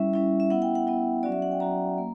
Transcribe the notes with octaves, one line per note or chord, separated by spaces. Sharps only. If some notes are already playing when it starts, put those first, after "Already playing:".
Already playing: G3 C#4 E4 E5
G3 C#4 E4
E5
B3 E4 F#5
G5
F#5
B3 E4 F#5
F#3 C#4 F#4 D5
E5
F#5
G5
F#3 C#4 F#4 A#5
A#3